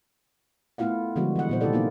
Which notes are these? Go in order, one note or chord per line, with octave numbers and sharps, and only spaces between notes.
A3 B3 E4 F4 F5 F#5
D3 F3 G3 G#3 B3 F#4
E3 F#5
A#2 B3 C5
C3 D#3 E4 G4 A4 D5
A#3 B3 D#4 F4